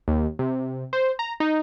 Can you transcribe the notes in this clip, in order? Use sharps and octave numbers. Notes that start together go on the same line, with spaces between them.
D#2
C3
C5
A#5
D#4